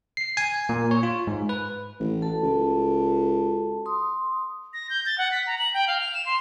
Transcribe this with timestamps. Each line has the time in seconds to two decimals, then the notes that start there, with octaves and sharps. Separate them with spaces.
0.17 C7
0.37 G#5
0.69 A#2
0.91 C#5
1.03 F4
1.27 G#2
1.49 B4
2.00 A1
2.22 F#4 A4 A5
2.43 C#2
3.86 C6 D#6
4.73 A#6
4.90 G6
5.06 A6
5.18 F#5
5.31 B6
5.47 A#5
5.59 F#7
5.74 G5
5.88 F5
6.01 F7
6.14 E7
6.26 C6